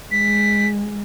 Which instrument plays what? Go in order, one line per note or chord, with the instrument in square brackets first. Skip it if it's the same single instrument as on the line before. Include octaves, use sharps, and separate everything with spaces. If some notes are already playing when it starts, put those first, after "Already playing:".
[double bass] G#3 [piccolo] B6